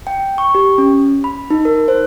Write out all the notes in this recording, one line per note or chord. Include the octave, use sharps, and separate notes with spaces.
G5
C#6
G4
C#4
B5
D#4
A#4
C5